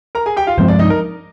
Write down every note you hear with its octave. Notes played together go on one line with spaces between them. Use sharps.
A#4 A#5
G#4 G#5
G4 G5
F4 F5
G2 F3 G#3 C4 C5
D4 D5
D#4 D#5
A#4